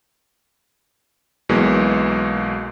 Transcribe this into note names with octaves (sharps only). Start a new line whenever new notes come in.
B1 B2 E3 G#3 A#3